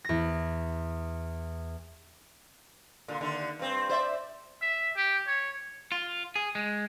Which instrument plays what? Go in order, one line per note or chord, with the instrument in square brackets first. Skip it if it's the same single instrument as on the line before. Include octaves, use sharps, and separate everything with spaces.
[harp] E2 A#6
[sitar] A#2 D3
D#2 D3
G2 C4
C5 D5 E5
[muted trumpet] E5
G4
C#5
[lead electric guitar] F4
G#4
G#3